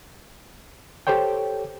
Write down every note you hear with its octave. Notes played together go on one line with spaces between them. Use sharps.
G4 A4 C5 C#5 G5